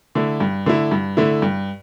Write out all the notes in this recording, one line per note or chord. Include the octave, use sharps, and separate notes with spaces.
D3 A3 E4
G2
D3 A3 E4
G2
D3 A3 E4
G2